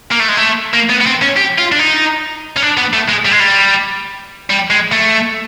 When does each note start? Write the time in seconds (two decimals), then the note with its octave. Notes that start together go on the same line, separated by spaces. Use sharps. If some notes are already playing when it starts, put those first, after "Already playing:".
0.12 A#3
0.20 A3
0.29 G#3
0.37 A3
0.74 A#3
0.89 B3
1.01 B3
1.06 C4
1.22 C#4
1.36 G4
1.58 F4
1.72 D4
1.79 D#4
2.57 C#4
2.62 D4
2.77 B3
2.93 A3
3.09 G#3
3.25 G3
3.31 G#3
3.40 G3
4.50 G3
4.70 G#3
4.92 A3